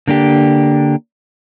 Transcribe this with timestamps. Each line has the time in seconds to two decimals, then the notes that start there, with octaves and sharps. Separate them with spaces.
0.07 D3 A#3 D4 G4